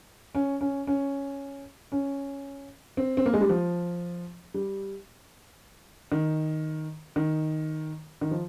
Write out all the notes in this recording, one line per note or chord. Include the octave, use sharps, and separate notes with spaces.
C#4
C#4
C#4
C#4
C4
C4
A#3
G#3
G3
F3
G3
D#3
D#3
D#3
F3